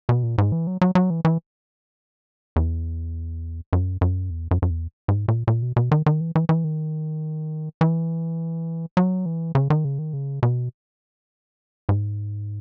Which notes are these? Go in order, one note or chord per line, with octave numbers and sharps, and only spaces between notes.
B2
A#2
G#2
E3
F#3
F#3
F#3
E3
E3
E2
F#2
F#2
E2
F#2
F#2
E2
G#2
A#2
A#2
B2
B2
D#3
D#3
E3
E3
E3
D#3
E3
F#3
E3
C#3
D#3
C#3
D#3
C#3
B2
G#2